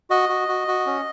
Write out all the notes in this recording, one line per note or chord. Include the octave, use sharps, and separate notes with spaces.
F#4 D#5
F#4
F#4
F#4
C#4